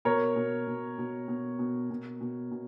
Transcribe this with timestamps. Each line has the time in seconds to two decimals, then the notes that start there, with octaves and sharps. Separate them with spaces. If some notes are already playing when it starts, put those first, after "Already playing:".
0.05 B2 A#4 C#5
0.36 B2
0.67 B2
0.98 B2
1.28 B2
1.59 B2
1.90 B2
2.21 B2
2.51 B2